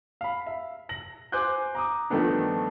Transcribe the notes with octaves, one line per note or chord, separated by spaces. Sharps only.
F5 B5
E5
A#6 F#7
C5 G#5 C6 D6 F#6 G6
A#5 D6 D#6
G2 D#3 F3 A3 B3 D4